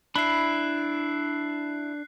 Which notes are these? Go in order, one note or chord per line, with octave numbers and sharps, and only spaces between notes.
D4 E4 B5 F#6 C7